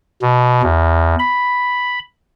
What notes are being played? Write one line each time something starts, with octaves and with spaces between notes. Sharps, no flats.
B2
E2
B5